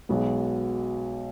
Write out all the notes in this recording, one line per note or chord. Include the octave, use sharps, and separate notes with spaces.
B1 B2 G#3 B3 F#4